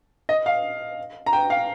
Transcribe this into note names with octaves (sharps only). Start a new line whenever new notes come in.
D#5
F5
A#5
G5
F5